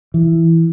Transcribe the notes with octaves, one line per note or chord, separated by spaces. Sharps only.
E3